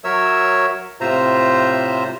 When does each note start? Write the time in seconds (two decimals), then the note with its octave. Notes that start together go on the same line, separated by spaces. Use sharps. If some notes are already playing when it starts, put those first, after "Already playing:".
0.04 F#3 A#4 C#5 E5 E6
1.01 A2 C3 F4 C5 E5 A#5